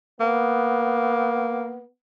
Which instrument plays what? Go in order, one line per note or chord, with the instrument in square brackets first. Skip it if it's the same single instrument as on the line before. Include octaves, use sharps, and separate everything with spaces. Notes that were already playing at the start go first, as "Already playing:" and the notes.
[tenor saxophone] A#3 [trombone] B3